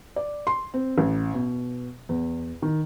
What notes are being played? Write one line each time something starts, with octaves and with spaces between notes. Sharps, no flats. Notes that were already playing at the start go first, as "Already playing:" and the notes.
D5
C6
C4
A1
B2
E2
D#3